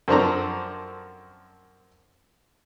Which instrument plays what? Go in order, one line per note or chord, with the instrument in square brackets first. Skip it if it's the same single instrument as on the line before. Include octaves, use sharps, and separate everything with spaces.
[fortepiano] F#2 F3 C4 D4 A4 A#5